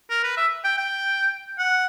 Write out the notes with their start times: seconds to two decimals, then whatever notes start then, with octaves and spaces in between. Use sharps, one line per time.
0.10 A#4
0.24 B4
0.37 E5
0.64 G5
0.78 G5
1.59 F#5